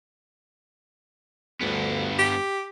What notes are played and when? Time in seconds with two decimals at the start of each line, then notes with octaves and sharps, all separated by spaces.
1.61 D2 G2 B3
2.19 G4